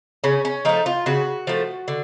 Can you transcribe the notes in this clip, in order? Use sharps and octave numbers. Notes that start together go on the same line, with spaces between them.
C#3 C#4
C#4
F3 A3 D#4
F4
C#3 F#4
F3 A3
D3